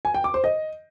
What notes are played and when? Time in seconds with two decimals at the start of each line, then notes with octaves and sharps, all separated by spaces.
0.05 G#5
0.14 G5
0.24 D6
0.34 C5
0.44 D#5